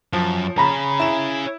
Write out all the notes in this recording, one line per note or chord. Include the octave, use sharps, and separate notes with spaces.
F#2 F3
C#4 G#4 A#5 B5
E4 E7